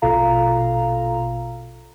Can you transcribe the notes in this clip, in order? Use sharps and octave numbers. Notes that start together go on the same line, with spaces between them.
A#1 B2 F4 A4 F5 A#5